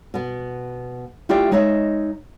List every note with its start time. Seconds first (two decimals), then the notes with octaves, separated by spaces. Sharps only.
0.14 B2 B3
1.29 A3 E4 F4 G4 D5 E5
1.51 G#3 D#4 C#5 D#5 E5